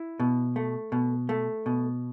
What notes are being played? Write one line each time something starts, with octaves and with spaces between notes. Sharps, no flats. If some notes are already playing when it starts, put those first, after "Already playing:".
Already playing: E4
B2
A3
B2
A3
B2